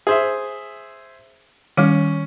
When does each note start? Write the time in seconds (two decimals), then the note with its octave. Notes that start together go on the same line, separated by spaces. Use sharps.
0.07 G#4 C5 E5
1.77 D#3 G3 C#4